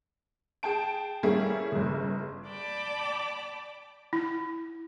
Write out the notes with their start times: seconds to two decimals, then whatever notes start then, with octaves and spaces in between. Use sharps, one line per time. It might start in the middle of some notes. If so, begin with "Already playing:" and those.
0.63 G#4 G5 A5 D7
1.23 G3 A3 A#3 C#4 E4 G#4
1.72 G1 C#3
2.47 D5 G5 A5 B5 D6
4.13 E4